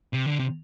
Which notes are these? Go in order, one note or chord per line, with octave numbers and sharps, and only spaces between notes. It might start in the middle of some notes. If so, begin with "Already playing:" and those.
C3
D3
C3